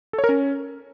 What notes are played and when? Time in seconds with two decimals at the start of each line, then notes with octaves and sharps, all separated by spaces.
0.13 A4
0.19 C#5
0.24 A#4
0.29 C#4